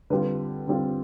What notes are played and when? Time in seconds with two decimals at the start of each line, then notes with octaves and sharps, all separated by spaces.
0.10 D3 G3 C4 F4 B4
0.67 D3 G3 C4 F4